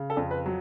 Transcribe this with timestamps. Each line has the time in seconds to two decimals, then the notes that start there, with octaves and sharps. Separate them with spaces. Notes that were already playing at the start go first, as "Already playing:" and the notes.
Already playing: C#3
0.10 A4
0.17 F2
0.31 B4
0.46 F#3